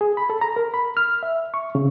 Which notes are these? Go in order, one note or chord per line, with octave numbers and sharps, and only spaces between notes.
G#4
B5
A4
A#5
A#4
B5
F6
E5
C#6
C#3